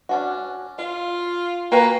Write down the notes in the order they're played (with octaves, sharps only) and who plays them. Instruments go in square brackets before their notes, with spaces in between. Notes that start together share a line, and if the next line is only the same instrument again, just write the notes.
[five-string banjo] C#4 D4 F#4
[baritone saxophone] F4 [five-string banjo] F5
[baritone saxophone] A#3 [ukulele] F#4 B4 G5 [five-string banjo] G#5